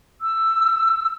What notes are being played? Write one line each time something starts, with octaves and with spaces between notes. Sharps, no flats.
E6